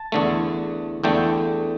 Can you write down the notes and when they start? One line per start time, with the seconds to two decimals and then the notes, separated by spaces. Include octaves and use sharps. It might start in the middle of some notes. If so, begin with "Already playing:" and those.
Already playing: A5
0.12 E2 D3 A3
1.03 E2 D3 A3 G5